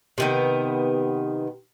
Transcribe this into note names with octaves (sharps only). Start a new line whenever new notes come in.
C3 D#3 B3